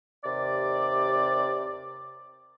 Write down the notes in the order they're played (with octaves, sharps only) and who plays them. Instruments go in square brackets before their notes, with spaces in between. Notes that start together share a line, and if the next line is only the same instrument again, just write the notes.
[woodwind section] D#2 C3 D5